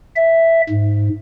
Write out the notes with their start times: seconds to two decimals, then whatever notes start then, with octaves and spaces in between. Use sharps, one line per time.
0.16 E5
0.69 G#2